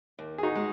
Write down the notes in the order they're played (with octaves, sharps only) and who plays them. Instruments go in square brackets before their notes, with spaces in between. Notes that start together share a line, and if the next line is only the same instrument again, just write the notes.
[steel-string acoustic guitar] D#2
[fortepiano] G#4
D#4 F#4
[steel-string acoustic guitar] G#3